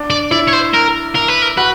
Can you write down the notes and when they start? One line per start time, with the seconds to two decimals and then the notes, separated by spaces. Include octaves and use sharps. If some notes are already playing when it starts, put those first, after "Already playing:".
Already playing: D4
0.10 D5
0.31 E4 D5
0.48 C#5
0.53 C5
0.74 A#4
1.15 A#4
1.28 B4
1.42 A#4
1.57 F#4 B4